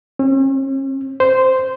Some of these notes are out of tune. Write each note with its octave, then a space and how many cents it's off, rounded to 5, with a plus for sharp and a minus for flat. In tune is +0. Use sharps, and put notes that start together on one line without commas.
C#4 -45
C5 -10